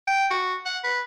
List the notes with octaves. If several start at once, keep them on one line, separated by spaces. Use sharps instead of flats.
G5
F#4
F#5
B4